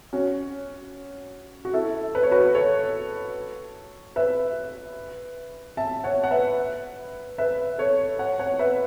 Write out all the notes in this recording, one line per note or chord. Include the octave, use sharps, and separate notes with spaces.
C#4 F#4
F#4
E4 A4
B4
C#5
F#4 B4
A4 C#5
B4 E5
E5 A5
C#5 F#5
F#5
B4 E5
B4 E5
A4 C#5
C#5 F#5
C#5 F#5
B4 E5